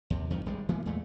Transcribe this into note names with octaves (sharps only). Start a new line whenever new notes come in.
D#2 C3
E2 G2 D#3 F3
G#1 G3 G#3
E3 G#3 A#3 B3
E2 A#2 G#3 A3